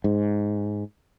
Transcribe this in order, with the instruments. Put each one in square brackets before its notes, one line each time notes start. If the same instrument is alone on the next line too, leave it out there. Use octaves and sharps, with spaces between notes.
[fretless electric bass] G#2